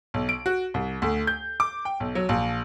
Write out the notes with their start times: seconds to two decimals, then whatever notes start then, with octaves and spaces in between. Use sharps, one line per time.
0.14 B1
0.29 D7
0.46 F#4
0.74 C2
1.02 D2
1.27 G6
1.60 D6
1.85 G5
2.00 B1
2.15 F#3
2.29 A#1